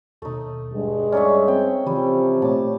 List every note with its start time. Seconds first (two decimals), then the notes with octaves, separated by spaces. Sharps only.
0.22 D#2 B2 A3 D#4
0.73 G2 G#3
1.12 C#4 D#4 D5 E5 C#6
1.48 C4 C5 G5
1.87 C3 E3 F3 G3
2.42 A#2 A3 C#5 A5 D6